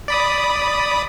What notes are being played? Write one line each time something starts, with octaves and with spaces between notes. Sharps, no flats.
D5 B5 D#6